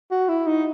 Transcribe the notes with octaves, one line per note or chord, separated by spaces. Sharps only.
F#4
E4
D#4